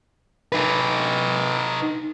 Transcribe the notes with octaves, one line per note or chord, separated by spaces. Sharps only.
D#4 B4